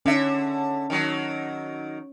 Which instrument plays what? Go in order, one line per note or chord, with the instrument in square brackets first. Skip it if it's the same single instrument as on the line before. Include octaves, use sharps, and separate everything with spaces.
[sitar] D3 E5 [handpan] C#4
[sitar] D#3 F#3